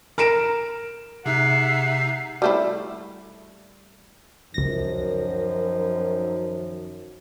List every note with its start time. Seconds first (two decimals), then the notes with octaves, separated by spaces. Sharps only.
0.18 A#4 A#5 D7 E7
1.26 C3 G#3 D#4 E5 F#5 C7
2.42 G3 A3 E4
4.54 C#2 F#2 D#3 F3 A#6